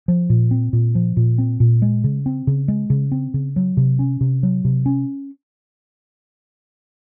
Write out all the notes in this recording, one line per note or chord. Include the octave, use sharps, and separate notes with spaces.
F3
A#2
C4
A#2
F3
A#2
C4
A#2
G#3
C#3
C4
C#3
G#3
C#3
C4
C#3
F#3
C3
C#4
C3
F#3
C3
C#4